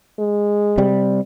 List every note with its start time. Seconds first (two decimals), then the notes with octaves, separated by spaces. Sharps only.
0.19 G#3
0.78 C3 G3